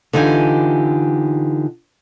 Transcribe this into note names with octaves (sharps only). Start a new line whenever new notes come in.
D3 E3 D#4 F4 G4 G#5